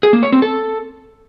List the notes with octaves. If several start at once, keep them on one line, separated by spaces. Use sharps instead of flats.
G#4
A#3
C#5
C4
A4